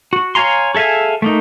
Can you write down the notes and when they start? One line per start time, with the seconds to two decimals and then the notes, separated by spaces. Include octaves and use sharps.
0.13 F#4
0.35 C#5 F5 G#5 A#5 C6
0.75 G#4 A4 E5 F5 G#5
1.22 A3 A#3 D#4